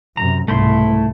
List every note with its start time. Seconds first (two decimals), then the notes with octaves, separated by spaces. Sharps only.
0.17 F#2 C3 A#5
0.48 C2 G#2 B2 A3 E4 C6